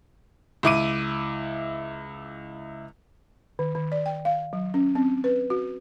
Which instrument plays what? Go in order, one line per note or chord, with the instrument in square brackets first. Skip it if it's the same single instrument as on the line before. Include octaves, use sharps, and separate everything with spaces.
[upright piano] C#2 E4 D6 D#7
[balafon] D#3
D#3
D5
G5
F5
F#3
C#4
C4
B4
F#4